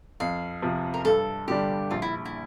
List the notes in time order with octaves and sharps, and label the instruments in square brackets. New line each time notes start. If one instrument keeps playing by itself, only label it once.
[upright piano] F2 [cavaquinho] F5
[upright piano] C3 F3
[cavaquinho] A#4
[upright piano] G2 [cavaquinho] A4
[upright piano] D3 G3 D4 [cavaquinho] G4
[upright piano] A#1 [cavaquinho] F4
[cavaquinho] E4
E4